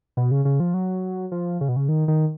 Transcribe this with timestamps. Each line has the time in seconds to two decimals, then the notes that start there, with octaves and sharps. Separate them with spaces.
0.17 B2
0.31 C#3
0.45 C#3
0.60 F3
0.74 F#3
1.32 F3
1.61 C#3
1.69 B2
1.76 C#3
1.89 D#3
2.08 D#3